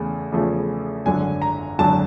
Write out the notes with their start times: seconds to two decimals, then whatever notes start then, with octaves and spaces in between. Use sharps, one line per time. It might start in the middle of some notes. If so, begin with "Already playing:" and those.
Already playing: E2 C#3 A3
0.32 E2 C#3 F3 A3
1.05 G#1 F#2 D3 F#3 G#5
1.42 A#5
1.79 G#1 F#2 D3 F#3 A5